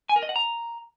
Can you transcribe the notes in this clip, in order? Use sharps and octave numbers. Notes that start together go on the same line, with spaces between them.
G#5
A#4
D#5
F#5
A#5